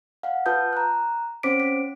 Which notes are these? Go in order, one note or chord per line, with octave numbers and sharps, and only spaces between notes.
F5 F#5
F4 B4 A5 D#6 G6
A#5 F#6
C4 C#4 C5 D6 B6 D7
B6